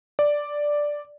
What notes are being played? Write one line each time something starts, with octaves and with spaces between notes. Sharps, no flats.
D5